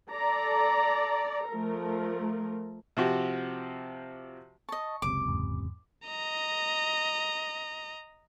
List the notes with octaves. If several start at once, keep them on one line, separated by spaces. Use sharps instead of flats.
A4 D5 A#5
F3 A3 A#4
C3 F3 F#4 G4
D#5 A5 C#6
F#1 C#2 C3 D6
E2 G#2
D#5 A#5